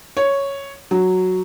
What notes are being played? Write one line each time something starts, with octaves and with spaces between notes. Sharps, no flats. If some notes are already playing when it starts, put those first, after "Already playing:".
C#5
F#3